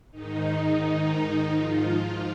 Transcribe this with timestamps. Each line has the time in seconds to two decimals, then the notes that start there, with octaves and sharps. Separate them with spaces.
0.11 G#2 D#3 D#4
1.55 G#2 F3 F4